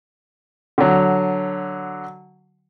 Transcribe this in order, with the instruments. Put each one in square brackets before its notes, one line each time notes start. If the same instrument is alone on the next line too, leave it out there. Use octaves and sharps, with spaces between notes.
[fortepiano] D3 F#3